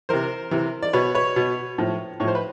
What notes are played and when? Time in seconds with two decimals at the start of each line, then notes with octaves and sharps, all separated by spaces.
0.09 C3 E3 A#4 C5
0.51 C3 E3
0.82 D5
0.93 B2 B4 C#5
1.15 B4 C#5
1.36 B2
1.78 A2 F3
2.20 A2 C#5
2.24 F3 C5
2.35 B4